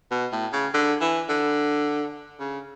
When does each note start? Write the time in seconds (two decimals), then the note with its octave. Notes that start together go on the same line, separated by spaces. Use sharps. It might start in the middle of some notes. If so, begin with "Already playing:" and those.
0.11 B2
0.32 A2
0.53 C#3
0.74 D3
1.01 E3
1.29 D3
2.40 C#3